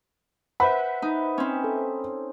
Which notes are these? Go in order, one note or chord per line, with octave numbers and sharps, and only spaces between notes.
B4 C5 E5 F#5 B5
D#4
C4 C#4
A4